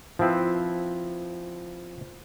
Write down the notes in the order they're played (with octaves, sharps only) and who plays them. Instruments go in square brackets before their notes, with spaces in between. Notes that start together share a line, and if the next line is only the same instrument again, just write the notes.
[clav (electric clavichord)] F3 C4 E4 B4